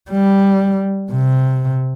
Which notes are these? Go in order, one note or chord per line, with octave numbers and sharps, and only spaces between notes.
G3
C3